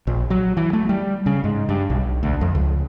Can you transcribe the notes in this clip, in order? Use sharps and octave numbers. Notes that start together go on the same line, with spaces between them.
A#1
F#3
E3
A3
G3
C#3
G#2
G2
B1
D2
F2
C#2